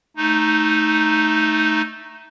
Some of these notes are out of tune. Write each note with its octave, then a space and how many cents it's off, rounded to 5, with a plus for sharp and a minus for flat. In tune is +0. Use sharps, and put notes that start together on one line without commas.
A3 +0 D#4 +0